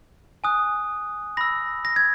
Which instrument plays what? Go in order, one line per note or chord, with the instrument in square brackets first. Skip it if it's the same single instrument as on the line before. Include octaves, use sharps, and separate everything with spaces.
[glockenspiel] G#5 D#6 F#6
B5 E6 A#6
A#6
G#6